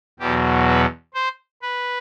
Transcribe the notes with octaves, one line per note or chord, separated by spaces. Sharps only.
E2 B2 F#3 G4
B4
C5
B4